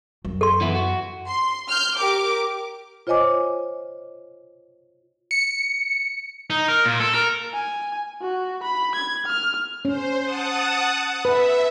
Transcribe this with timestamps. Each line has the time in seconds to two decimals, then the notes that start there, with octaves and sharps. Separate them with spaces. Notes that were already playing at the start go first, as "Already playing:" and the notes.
0.25 F#2
0.41 A4 C6
0.61 E3 B3 E4
0.75 F#4
1.27 C6
1.68 F6 G6
1.98 G4 A#4 D6
3.07 F4 C5 C#5 D#5 G#5 D6
5.31 C#7
6.50 D#4
6.68 A#4
6.85 A#2
7.00 A4
7.14 A#4
7.53 G#5
8.22 F#4
8.63 B5
8.96 G#6
9.26 F6
9.85 C#4 C5
10.22 F#5 A5 D#6
11.25 B4 E5